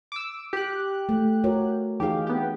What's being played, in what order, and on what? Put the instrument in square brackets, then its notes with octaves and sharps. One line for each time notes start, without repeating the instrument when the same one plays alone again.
[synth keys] D6 E6
G4 F#6
[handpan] A3
F#4 A#4 C#5
[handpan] E3 D#4 G#4 [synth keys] G4 F5
[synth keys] B3 G4